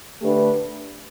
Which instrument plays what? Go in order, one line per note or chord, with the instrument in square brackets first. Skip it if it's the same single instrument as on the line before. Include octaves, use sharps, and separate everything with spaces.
[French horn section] D3 A3 D4 G4 B4